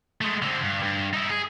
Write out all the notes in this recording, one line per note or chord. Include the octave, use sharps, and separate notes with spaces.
G#3 A3
D3 C4
G2
G2
D#4 E4
G#4